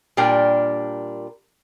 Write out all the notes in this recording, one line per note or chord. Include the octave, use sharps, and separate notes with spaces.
A#2 G3 D4 A#4 G5